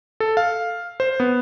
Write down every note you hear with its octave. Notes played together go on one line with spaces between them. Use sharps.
A4
F5
C5
B3